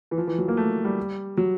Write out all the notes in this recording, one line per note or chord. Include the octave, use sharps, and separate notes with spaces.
E3
F3
E3
F#3
A#3
A3
G3
F#3